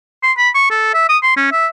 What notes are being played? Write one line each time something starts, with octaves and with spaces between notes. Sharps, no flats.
C6
B5
C#6
A4
E5
D#6
C6
C#4
E5